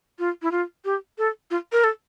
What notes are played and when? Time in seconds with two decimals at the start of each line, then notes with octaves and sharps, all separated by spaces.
0.19 F4
0.42 E4
0.52 F4
0.85 G4
1.18 A4
1.51 F4
1.72 A#4
1.84 A4